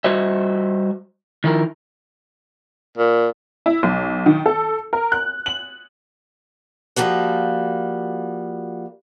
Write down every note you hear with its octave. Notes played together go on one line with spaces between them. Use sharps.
G3 F#4 C5 D#5 E5
D#3 F3 E4 A#4
A#2
E4
B1
D#3
A4
A#4
F#6
F#7
F3 G3 A#3 F#4